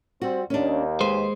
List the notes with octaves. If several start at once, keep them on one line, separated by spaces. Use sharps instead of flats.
G3 C4 F#4
D#2 C#4 D4
G#3 B4 C5